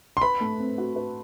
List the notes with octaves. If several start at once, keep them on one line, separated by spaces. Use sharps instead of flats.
C6
B4 B5
A3
C4
F#4
B4